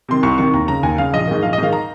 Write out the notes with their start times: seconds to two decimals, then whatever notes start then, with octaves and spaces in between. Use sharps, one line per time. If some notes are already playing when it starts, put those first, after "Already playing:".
0.09 C3 D#3 C6
0.23 C2 C#6
0.38 C3 D#3 C#6
0.54 D#2 A#5
0.68 C#3 A#5
0.83 D#2 G#5
0.98 C#3 F5
1.13 A#1 D#5
1.28 G#2 D#3
1.43 A#1 F5
1.53 D#5
1.58 G#2 D#3 F5
1.73 A#5